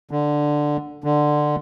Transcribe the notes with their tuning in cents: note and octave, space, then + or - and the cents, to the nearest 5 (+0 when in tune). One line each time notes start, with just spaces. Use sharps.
D3 +5
D3 +15